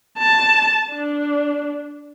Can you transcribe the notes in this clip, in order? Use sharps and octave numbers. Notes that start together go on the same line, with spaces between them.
A5
D4